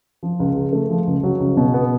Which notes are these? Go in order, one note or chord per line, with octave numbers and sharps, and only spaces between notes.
F3
C#2
C#3
A3
F3
C#2
F#3
C#2
B2
B3